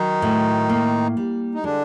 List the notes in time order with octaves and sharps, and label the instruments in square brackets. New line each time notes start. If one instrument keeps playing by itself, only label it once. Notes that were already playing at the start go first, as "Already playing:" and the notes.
Already playing: [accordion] D#3 D#4 [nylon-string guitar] F#3
[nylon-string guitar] A2
A#3
G3
[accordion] D#4
[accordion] D3 D4 [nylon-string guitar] G#3